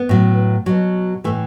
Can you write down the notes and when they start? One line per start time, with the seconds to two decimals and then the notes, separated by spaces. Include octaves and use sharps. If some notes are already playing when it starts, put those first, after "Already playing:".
Already playing: B3
0.09 A2 F#3
0.66 B2 F#3
1.24 A2 E3 A3